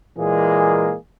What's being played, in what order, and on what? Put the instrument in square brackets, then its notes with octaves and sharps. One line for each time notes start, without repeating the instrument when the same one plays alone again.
[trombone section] A#2 E3 G#3 A#3 G#4